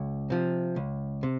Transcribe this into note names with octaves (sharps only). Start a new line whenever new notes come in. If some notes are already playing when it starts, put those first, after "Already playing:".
Already playing: C#2
C3 F3
C#2
C3